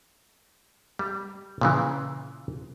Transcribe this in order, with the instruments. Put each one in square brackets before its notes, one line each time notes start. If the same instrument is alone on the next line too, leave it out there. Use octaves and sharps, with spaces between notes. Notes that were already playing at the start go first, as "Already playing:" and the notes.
[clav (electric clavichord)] G3
A#2 C#3 E3